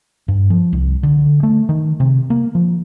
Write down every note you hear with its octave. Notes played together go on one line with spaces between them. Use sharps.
G2
F3
C2
D3
A3
D#3
C3
A#3
F3